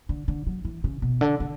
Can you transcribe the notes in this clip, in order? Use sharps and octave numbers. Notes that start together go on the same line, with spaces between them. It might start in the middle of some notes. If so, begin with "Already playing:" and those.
D3
D3
F#3
E3
C#3
B2
D3
D3